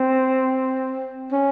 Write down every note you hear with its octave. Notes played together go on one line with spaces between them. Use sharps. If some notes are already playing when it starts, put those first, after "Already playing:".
Already playing: C4
C#4